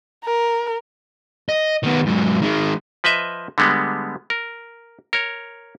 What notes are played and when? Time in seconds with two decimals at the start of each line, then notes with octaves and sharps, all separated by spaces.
0.24 A#4
1.49 D#5
1.84 D#3 B3
2.06 G#2 F#3
2.42 D#3 G#3
3.04 F3 B4 D#5 E5
3.58 D3 G3 G#3 B3
4.30 A#4
5.13 A#4 C#5